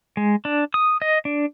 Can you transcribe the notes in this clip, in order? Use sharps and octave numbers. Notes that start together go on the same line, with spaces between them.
G#3
D4
D#6
D#5
D4